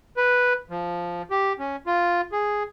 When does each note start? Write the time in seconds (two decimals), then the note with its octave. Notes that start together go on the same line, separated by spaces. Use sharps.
0.17 B4
0.70 F3
1.31 G4
1.59 C#4
1.87 F4
2.32 G#4